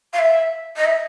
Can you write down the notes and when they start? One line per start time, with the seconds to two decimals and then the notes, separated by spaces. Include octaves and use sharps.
0.13 F5
0.18 E5
0.76 D#5
0.85 E5